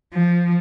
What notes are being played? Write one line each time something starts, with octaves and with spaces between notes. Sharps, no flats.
F3